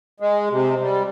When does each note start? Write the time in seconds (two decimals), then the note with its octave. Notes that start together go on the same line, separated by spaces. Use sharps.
0.20 G#3
0.51 C3
0.80 G3